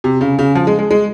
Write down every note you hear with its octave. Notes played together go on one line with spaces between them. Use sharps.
C3
C#3
C#3
F3
G#3
G#3
G#3